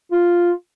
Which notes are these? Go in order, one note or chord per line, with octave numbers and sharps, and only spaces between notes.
F4